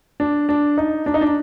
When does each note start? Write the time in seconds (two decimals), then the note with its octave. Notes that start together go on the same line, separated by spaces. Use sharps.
0.20 D4
0.49 D4
0.78 D#4
1.06 D4
1.14 D#4
1.21 D4